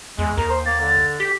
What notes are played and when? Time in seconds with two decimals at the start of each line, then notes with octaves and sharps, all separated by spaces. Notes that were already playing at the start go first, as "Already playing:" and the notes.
0.18 E2 G#3
0.38 D#2 A#4
0.49 C5
0.66 A#3 A6
0.80 D3
1.20 G4 B6